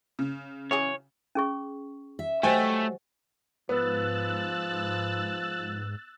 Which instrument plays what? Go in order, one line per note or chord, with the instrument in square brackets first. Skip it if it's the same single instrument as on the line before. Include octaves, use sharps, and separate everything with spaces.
[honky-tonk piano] C#3
[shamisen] E3 F#3 G#4 [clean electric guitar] C#5
[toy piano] C#4 G#4 C#6
[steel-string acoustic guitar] E5
[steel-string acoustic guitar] F#3 [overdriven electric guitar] A3 [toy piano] G4 C5 D#5 [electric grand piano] G5 G#5
[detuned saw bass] G#2 [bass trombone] F3 [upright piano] B3 [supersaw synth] E6 F#6 A6